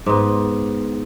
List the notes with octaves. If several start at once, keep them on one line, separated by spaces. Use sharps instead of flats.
G#2 B3